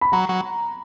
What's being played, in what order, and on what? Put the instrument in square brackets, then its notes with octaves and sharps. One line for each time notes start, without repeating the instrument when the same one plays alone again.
[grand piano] B5
[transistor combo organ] F#3 [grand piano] A#5
[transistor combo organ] F#3